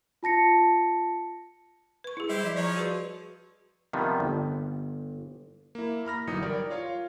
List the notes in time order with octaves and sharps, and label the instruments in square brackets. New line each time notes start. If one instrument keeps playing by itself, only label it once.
[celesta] F4 A5 A#6 C#7
[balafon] B4 C#6
E4 G#4
[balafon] G3 [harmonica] E4 G4 C5
[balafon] F3 D#5
[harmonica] F3 C#5 [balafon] D5 A#5
[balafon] F#4 G#4 B4
[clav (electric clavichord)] C3 D#3 F3 G3 B3
G1
[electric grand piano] A#3 E4
A#5 B5 F6 A#6
G1 E3 F#3 D#4 D#6 C#7
G3 A#4 D5
F4 C#5 F5